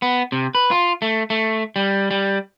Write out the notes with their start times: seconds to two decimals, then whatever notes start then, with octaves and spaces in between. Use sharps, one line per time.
0.02 B3
0.32 C3
0.55 B4
0.71 F4
1.02 A3
1.30 A3
1.76 G3
2.11 G3